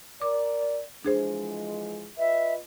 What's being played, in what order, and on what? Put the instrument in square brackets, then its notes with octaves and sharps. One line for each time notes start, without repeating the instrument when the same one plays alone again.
[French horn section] A#4 D5 [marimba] D6
[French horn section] E3 F3 G#3 [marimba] D4 G#4 C5
[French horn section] F4 B4 D#5 [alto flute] E5